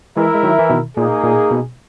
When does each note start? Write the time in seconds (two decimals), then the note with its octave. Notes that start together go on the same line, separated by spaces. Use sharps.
0.16 E3 G#3 E4 A#4 E5
0.35 G#3
0.43 D#3 F#3
0.59 E3
0.70 B2 D#3
0.97 A#2 A#3 D#4 G#4
1.24 A#2
1.51 B2